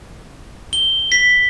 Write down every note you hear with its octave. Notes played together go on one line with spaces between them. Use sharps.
G7
B6